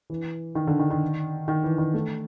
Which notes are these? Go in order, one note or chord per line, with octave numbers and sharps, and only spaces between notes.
E3
D#3
D3
D#3
D#3
D#3
E3
D#3
A3